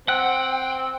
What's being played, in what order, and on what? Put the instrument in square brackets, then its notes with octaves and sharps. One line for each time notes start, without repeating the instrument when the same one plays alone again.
[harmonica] C4 [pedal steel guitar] F#5 F#6 [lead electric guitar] G5